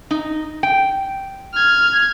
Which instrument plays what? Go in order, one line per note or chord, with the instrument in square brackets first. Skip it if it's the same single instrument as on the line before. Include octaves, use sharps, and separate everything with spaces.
[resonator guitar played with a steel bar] D#4
G5
[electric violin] F6 G#6